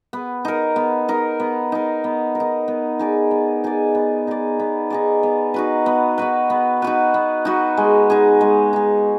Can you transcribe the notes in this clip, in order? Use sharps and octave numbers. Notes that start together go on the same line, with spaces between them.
B3
D#4 A#4
B3
D#4 A#4
B3
D#4 A#4
B3
A#4
D#4
B3
D#4 G#4 D5
B3
D#4 G#4 D5
B3
D#4 G#4 D5
B3
D#4 G#4 D5
B3
D#4 F#4 B4
B3
D#4 F#4 B4
B3
D#4 F#4 B4
B3
D#4 F#4 B4
G#3
D#4 G#4
G#3
D#4 G#4